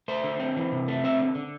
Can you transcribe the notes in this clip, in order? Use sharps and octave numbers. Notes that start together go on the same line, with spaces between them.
A3 C5
D3
C4
E3
C3
A3
C4 E5
D3
D3